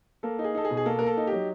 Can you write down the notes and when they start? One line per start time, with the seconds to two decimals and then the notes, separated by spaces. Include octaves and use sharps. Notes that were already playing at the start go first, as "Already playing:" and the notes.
0.23 A#3 A4
0.39 D#4
0.44 G#4
0.55 D#4 A4
0.65 G#4
0.70 B2
0.77 G#4
0.86 A#3 A4
0.99 A#4
1.01 A#3
1.07 A4
1.17 D#4
1.27 G4
1.32 F#3